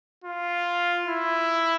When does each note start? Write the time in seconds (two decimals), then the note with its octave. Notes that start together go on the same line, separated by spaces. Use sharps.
0.24 F4
1.08 E4